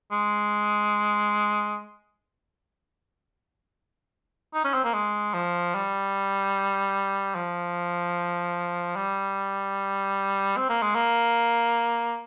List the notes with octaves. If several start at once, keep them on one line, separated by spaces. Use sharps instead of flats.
G#3
D#4
C#4
C4
A#3
G#3
F3
G3
F3
G3
C4
A#3
G#3
A#3